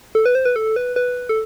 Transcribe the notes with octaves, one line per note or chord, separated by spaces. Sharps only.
A4
B4
C5
B4
A4
B4
B4
A4